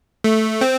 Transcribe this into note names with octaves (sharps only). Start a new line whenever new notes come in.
A3
C4